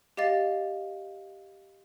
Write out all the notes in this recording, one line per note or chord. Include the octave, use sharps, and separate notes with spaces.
G4 D#5 F5 A6